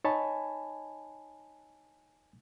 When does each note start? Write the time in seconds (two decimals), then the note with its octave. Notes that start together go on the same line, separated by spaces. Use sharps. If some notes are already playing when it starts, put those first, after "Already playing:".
0.04 D#4 C#5 D#5 G#5 A5 B5